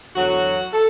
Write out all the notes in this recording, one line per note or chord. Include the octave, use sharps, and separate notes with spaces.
E2 D3 F#3 F#4
A4